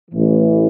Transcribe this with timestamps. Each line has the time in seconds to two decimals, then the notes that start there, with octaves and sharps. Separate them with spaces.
0.11 A1 A2 E3